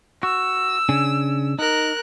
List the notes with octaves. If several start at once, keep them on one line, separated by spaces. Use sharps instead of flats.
F#4 E6
C#3 D4 G#5
D#4 A#4 F#6